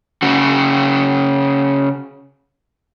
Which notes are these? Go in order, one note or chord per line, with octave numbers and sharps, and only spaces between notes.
C#3 F#4